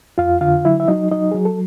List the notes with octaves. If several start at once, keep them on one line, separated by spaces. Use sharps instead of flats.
F2 F4 F5
D3 F4 F5
F#3 E4 E5
E5
F#3 D#4 D#5
F#3 D#4 D#5
F#3 G#4
A4